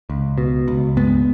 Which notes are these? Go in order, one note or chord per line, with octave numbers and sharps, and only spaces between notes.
C#2
B2
C#2
G2 G#3 B3